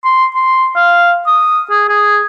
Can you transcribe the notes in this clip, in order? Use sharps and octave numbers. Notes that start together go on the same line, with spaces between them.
C6
C6
F5
D#6
G#4
G#4